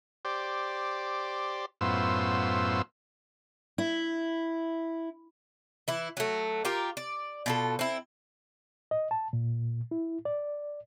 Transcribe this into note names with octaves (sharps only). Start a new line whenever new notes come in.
G4 C5 D5
F#2 A2 B3 F4 C5 E6
E4
E3 E4
F#3 A3
F4 G4 A#4
D5
B2 F4 A4
C4 E4
D#5
A5
A#2
E4
D5